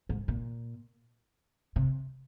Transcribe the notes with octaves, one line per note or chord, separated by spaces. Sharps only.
G#2
A#2
C3